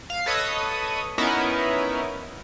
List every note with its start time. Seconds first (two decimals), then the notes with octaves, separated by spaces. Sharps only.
0.10 F5
0.26 A4 B4 C#5 D#5 D#6
1.18 B3 C#4 D#4 E4 A#4 B4